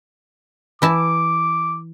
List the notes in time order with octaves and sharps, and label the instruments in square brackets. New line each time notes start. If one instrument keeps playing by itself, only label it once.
[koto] E3 E4 A5 [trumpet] D6